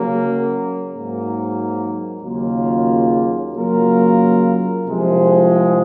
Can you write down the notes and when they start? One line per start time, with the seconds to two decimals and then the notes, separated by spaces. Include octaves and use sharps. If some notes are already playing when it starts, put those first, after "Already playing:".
Already playing: C#3 F#3 A#3
0.89 G#2 F#3 A#3
2.21 D#2 C#3 F#3 A#3 F4
3.53 C#3 F#3 A#3 F4 A#4
4.86 C2 C3 F3 G#3